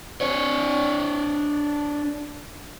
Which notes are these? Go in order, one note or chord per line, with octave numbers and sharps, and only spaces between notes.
D4 C#5